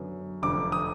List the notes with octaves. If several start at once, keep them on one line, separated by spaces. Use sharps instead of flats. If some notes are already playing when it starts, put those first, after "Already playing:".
Already playing: F#2 D3 F#3 B3
F1 F2 D3 D6
D#6